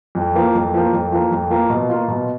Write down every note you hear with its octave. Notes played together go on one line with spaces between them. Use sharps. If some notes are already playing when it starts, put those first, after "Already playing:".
F2
F3 A#3
F2
F3 A#3
F2
F3 A#3
F2
F3 A#3
B2
A#3 F4
B2